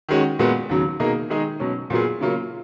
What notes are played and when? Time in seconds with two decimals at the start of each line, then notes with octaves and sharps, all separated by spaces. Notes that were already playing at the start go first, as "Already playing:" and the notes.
0.09 D#3 G#3 C#4 F#4
0.39 A#2 G#3 B3 F#4
0.69 D#2 C#3 F#3
1.00 B2 A#3 D#4 G#4
1.30 D#3 G#3 D#4 G#4
1.60 B2 F#3 C#4
1.90 A#2 F#3 B3 F4 G#4
2.20 C#3 F#3 A#3 C#4 F4